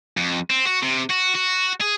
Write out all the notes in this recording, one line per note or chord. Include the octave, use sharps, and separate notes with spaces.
F2
C4
F#4
C3
F#4
F#4
G#4